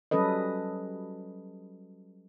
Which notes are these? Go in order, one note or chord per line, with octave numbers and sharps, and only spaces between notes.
F#3 G3 C#4 A4 B4 D#5